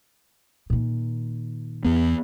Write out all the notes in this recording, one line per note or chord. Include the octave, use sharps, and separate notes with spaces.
A#2 D#3
E2 B3